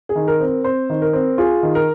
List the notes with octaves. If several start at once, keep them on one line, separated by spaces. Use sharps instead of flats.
G#4
D#3
A#4
C4
A#4
C4 C5
D#3
A#4
C4
F4 G#4
D#3
A#4